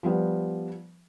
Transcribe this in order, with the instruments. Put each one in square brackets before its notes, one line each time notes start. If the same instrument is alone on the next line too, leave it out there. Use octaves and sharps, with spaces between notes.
[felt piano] F3 G3 B3